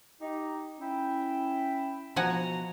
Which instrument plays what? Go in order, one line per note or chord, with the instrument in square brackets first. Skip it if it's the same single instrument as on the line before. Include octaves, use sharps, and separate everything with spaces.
[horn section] D#4 G4
C#4 E4 G5
[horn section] B2 A#5 [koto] F3 F#5 G#5